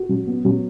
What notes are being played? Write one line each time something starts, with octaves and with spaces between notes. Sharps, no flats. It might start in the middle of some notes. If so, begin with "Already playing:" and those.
Already playing: F#4
F#3
B3
F#3